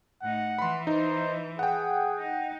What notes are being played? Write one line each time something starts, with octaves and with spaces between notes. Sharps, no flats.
A2 D#4 F#5
E3 B5 C6
D#4 C5
G#4 F#5 G5
D#4